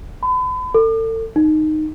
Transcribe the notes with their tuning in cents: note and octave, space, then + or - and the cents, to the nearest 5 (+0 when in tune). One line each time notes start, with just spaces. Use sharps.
B5 +40
A4 +35
D#4 -10